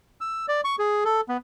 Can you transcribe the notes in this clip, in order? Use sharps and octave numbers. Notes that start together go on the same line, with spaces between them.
E6
D5
C#6
G#4
A4
B3